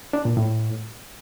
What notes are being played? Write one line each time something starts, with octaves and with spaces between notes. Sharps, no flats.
D4
A#2
A2